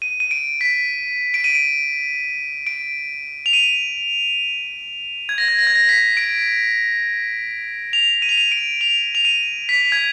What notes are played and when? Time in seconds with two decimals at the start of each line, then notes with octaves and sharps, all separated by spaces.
0.02 D#7
0.20 D#7
0.31 D7
0.61 B6
1.34 D7
1.44 D#7
1.55 D7
2.67 D7
3.46 F7
3.53 D#7
5.29 G#6
5.38 A#6
5.48 G#6
5.59 A#6
5.67 G#6
5.75 A#6
5.89 B6
6.17 D7
7.93 F7
8.22 D#7
8.29 F7
8.37 D#7
8.52 D7
8.81 F7
9.15 F7
9.25 D#7
9.69 B6
9.92 G#6